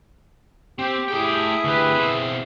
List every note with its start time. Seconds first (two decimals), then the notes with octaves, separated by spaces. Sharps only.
0.79 C4 G4
1.08 A3 E4 G#4 G5
1.64 D2 G4 B4
1.94 B2 C4